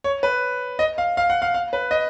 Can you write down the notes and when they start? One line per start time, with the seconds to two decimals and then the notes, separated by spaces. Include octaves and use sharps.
0.04 C#5
0.23 B4
0.79 D#5
0.98 F5
1.17 F5
1.30 F#5
1.42 F5
1.54 F5
1.73 B4
1.91 D#5